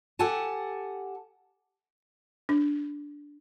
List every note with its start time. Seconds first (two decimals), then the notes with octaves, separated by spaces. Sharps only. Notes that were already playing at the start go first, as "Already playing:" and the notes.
0.19 G4 A4 F#5 G#5 A5
2.49 D4